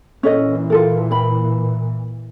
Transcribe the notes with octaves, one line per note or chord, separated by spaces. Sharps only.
A#2 E3 C#4 A4 D#5
F4 A4 A#4
A#4 B5